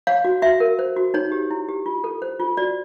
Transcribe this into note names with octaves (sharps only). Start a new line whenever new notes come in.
C#5 F5
F#4
F#4 E5
A#4
C5
F#4
D#4 C#5
G4
E4
G4
F4
A4
C5
F4
F#4 D5